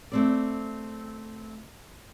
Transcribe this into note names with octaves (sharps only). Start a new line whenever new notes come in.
A3 C4 D5